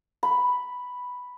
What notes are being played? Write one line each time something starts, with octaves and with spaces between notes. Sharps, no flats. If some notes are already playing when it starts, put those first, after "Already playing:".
B5